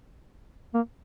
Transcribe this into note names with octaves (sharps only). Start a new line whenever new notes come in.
A#3